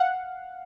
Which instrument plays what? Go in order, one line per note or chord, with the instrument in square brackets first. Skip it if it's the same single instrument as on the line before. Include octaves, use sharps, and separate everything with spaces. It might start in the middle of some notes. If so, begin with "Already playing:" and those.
Already playing: [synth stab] F5 F#5